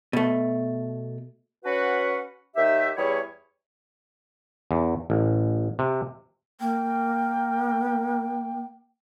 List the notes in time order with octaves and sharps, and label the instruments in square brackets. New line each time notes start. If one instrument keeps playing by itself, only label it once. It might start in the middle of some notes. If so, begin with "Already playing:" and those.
[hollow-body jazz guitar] B2 A3
[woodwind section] C#4 F#4 B4 F#5
D#2 D#3 D#4 G4 E5
E2 G3 E4 G#4 C#5
[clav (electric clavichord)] E2
A1
C3
[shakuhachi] A#3 [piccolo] G5